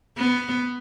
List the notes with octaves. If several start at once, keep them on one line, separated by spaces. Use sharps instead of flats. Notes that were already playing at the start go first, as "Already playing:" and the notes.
B3